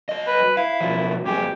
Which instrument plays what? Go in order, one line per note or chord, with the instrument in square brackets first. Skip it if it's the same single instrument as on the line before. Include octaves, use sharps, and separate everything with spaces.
[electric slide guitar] F#3 D#5
[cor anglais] B4
[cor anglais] E4 [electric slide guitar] F5
[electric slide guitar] B2 F3 F#3
[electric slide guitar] F2 F#3 G#4 [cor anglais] G4